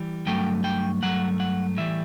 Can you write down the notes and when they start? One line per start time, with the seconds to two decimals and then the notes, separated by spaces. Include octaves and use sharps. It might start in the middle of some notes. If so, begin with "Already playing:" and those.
Already playing: E3 G3
0.27 G2 F#3 A3 G5
0.64 G5
1.02 G2 F#3 A3 F#5
1.40 F#5
1.77 A2 E3 G3 E5